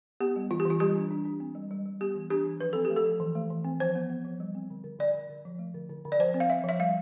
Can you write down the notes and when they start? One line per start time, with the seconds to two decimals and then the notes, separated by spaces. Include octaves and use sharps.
0.20 B3 G4
0.36 G3
0.51 E3 F4
0.60 G4
0.65 E3 F4
0.80 G3 G4
0.96 D4
1.11 D4
1.25 D4
1.40 C4
1.55 G3
1.71 G3
1.86 G3
2.01 B3 G4
2.15 E3
2.30 D4 G4
2.45 E3
2.60 F3 B4
2.73 C4 A4
2.85 G4
2.90 A3
2.96 A4
3.05 F3
3.20 E3
3.35 A3
3.50 E3
3.65 C4
3.80 F3 C5
3.95 B3
4.10 B3
4.25 F3
4.40 G3
4.55 C4
4.70 D3
4.84 D3
4.99 D3 D5
5.15 D3
5.29 D3
5.45 F3
5.59 A3
5.74 D3
5.90 D3
6.05 D3
6.12 D5
6.19 F3 C5
6.34 C4
6.40 F5
6.49 C4 E5
6.64 F3 E5
6.79 G3 F5